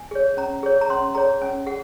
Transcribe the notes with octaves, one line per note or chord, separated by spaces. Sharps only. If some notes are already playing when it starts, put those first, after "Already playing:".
Already playing: G#5
G#4 C#5
C#4 A#5
G#4 C#5
A#5
C#4 C6
G#4 C#5 A#5
C#4 G#5
G#4 F#5